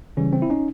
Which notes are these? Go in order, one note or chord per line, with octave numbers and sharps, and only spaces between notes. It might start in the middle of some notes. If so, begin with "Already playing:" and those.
C#3 E3 G3 C#4
C4
E4
C#4 D#4